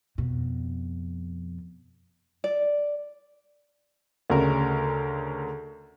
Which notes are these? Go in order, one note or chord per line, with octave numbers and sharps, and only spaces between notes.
F2 B2
D5
D2 C#3 A#4